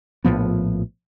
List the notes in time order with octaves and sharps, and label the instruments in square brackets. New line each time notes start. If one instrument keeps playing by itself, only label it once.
[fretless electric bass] A#1 A2 F3 B3